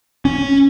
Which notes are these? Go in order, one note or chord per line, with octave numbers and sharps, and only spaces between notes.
C#4